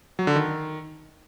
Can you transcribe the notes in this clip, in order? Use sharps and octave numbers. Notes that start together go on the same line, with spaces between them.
F#3
D3
D#3